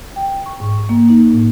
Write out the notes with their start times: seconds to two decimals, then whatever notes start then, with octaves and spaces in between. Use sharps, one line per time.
0.16 G5
0.46 C#6
0.60 G#2
0.89 A#3
1.10 D#4
1.31 A2